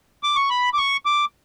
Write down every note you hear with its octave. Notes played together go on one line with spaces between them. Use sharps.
D6
C#6
B5
D6
C#6
D6